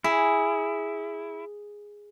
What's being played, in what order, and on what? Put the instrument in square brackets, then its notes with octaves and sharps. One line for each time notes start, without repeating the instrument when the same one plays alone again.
[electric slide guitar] E4 [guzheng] G#4